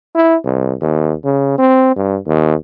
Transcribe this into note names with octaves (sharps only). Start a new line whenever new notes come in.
E4
C2
D#2
C#3
C4
G2
D#2